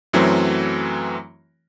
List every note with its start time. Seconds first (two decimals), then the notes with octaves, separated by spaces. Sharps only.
0.13 F#2 E3 F#3 A3 C4